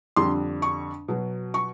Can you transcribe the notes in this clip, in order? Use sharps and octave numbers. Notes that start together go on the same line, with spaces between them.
F2 D3 G3 C6
C#6
B2 F#3
C#6